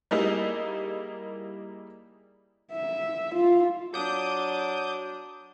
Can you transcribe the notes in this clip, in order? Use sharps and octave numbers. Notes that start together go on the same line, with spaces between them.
G3 A#3 D#4 E4 G#4
E5
F4
F#3 D4 D6 D#6 G6